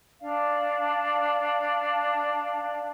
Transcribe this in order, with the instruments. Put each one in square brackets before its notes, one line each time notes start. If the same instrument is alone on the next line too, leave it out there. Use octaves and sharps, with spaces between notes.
[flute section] D4 D5 F5